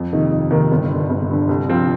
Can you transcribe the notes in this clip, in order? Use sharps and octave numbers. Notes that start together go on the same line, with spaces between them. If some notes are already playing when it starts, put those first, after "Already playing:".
Already playing: F2
C3 D#3 A#3 D#4
F2
C3 D#3 A#3 D#4
G1
G2 D3
G1
G2 D3
C2
C3 F3 C4